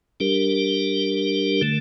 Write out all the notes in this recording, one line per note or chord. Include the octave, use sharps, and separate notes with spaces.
G3 D4 G4 A#4
D3 A3